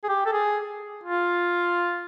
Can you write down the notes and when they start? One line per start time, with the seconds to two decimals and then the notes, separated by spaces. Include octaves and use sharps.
0.04 G#4
0.09 G4
0.26 A4
0.32 G#4
1.03 F4